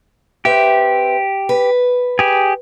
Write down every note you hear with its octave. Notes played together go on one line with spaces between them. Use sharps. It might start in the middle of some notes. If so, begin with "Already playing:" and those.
C4 G4 B4 E5
B4
G4 G#4